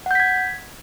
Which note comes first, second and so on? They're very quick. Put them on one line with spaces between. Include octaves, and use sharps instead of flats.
F#5 G6 B6 G#6